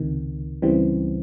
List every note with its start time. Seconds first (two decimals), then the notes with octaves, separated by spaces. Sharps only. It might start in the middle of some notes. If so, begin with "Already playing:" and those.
Already playing: C#2 C3 D#3
0.62 C#2 C#3 E3 G3 C4